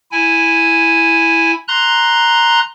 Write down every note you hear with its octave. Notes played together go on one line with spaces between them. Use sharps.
E4 G#5
A#5 C6 F#6